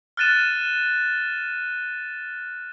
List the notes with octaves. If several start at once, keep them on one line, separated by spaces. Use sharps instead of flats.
F6 F#6 A6 D#7 E7